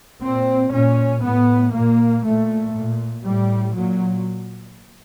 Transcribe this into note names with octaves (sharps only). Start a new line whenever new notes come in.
A#2 C4
A#2 C#4
A2 B3
A#2 A#3
A#2 A3
A#2
A2 G3
A#2 F#3